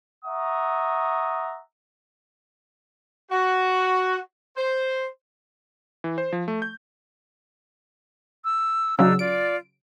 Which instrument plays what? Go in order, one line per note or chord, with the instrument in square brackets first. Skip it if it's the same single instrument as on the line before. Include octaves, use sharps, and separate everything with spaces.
[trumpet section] E5 F#5 G#5 A#5 C#6 D#6
[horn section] F#4
C5
[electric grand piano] E3
C5
F3
A3
G6
[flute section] E6
[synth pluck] C#3 F#3 [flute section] D4 D#4 E6
[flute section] F4 D5 [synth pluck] D7